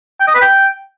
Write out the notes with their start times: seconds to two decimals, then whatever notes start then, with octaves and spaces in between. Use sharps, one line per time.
0.20 G5
0.27 D#5
0.35 B4
0.42 G5